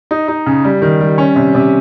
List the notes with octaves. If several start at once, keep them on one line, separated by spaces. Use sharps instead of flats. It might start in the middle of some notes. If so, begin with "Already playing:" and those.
D#4
D#4
C#3
G3
D#3
G3
C#4
C3
C3